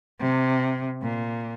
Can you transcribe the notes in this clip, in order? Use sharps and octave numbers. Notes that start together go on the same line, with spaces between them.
C3
A#2